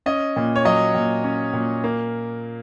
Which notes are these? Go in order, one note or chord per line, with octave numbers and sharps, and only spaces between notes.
C#4 D#5
A#2
C#5
F#3 D#5
A#2
C#4
A#2
A#3